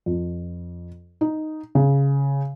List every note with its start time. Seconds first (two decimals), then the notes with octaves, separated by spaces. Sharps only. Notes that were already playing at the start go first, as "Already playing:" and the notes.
0.06 F2
1.21 D#4
1.75 C#3